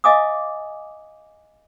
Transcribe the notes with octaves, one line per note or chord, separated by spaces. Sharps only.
D#5 F5 G#5 D6 D#6